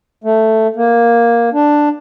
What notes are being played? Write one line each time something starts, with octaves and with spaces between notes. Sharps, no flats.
A3
A#3
D4